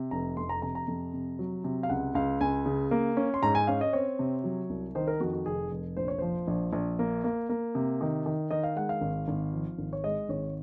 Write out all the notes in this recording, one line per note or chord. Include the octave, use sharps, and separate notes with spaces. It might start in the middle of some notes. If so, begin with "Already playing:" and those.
Already playing: C3
F1 A#5
F2 C6
A#5
C3 A#5
A#5
F2
C3
F#3
C3
F5
C#2 F#5
C#2 F5
C#2 G#5
C#3
A#3
C#4
C6
G#2 A#5
G#5
C#4 F5
D#5
C4 C#5
C3
F#3
C2
D#3 C5
A#4
F2 F#4
F#4
F1 G#4
F1
A#1 C5
C#5
F3 C5
A#1
A#1
A#3
A#3
A#3
C3
D#3
D#3
D#3 D#5
F5
G#3 F#5
F5
G#1
G#1
F3
G#1
C#5
G#3 D#5
G#1 C#5